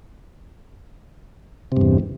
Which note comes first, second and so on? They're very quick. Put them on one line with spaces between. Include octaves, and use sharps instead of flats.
C3 G2 E2